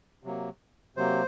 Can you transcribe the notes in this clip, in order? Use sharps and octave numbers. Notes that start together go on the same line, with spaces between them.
C3 F#3 A#3
C3 F#3 A#3 C5